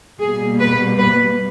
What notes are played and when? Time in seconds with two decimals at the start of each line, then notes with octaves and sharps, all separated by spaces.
0.20 B2 G3 A#3 G#4
0.59 B4
0.98 B4